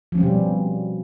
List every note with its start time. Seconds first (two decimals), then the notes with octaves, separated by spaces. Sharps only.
0.12 F3
0.15 C#4
0.18 C4
0.20 G3
0.23 B2